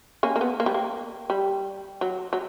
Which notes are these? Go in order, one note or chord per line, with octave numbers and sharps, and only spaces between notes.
A#3 C#4
A#3
B3
A#3
G3
A#3
G3
F#3
F#3